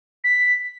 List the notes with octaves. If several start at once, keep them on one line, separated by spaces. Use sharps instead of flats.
B6